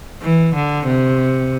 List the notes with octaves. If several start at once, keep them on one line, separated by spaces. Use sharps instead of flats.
E3
D3
C3